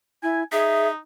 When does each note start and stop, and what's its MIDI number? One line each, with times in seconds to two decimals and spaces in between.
0.23 0.43 64
0.23 0.42 80
0.52 0.97 63
0.52 0.87 68
0.52 0.88 76